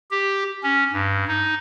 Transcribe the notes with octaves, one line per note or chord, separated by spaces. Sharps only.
G4
C#4
G2
D#4